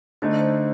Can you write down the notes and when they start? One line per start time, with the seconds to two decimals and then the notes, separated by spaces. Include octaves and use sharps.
0.22 D3 A3 D#4 C5
0.31 D5
0.41 C5